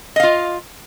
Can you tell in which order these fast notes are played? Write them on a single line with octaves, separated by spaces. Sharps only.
D#5 F5 F4